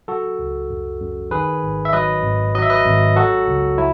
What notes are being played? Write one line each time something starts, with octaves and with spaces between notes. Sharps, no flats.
F#3 F#4 A4
C#2
F#2
F#2
D#3 G#4 B4
G#1
E5
F#3 B4 D#5
G#1
F#3 D#5
E5
B4 D#5
G#1
F#3 F#4 A4
C#2
F#3 E4